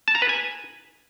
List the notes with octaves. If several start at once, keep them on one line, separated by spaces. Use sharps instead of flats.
A5
A#5
B4
G#5